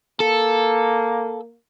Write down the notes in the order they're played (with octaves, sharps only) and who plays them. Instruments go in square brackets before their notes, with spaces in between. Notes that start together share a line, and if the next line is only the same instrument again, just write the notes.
[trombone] A#3 [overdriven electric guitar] A4